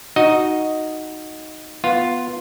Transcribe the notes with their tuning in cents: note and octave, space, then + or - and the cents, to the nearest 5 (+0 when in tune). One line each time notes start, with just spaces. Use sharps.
D#4 +0 F#4 +0 D#5 +5
B3 +0 F4 +0